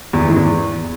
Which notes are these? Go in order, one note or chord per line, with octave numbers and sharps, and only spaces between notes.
E2
E3
G#2
E2